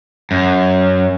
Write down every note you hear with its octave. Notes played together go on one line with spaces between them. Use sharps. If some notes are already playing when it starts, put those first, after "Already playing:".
F#2